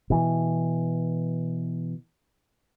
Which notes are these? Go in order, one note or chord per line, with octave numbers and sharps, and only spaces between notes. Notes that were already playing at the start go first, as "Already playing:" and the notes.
B2 E3